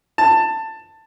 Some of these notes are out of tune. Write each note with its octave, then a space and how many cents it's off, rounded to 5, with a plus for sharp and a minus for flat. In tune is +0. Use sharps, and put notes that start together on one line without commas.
A5 +15